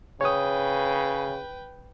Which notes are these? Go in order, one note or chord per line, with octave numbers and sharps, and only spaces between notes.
C#3 B4 C#5 G5 D#6